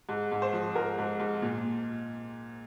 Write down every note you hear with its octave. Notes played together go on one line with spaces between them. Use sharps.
G#2
G#2
C5
F3
G#2 A#4
G#2
G#2
A#2